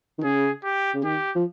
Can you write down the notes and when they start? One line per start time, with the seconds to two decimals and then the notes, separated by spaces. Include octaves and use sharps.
0.19 D#3
0.23 C#3 G#4
0.64 G4
0.94 C#3
1.03 D#3 G4
1.35 F3